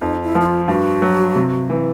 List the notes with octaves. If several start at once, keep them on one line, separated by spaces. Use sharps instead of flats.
F2 D#4
E4
F3
E4
F4
G2 F#4
F#3
C3
E3